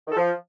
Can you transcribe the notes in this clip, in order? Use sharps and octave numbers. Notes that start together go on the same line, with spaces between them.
D#3
A4
F3